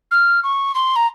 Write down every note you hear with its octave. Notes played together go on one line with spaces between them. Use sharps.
F6
C#6
C6
A#5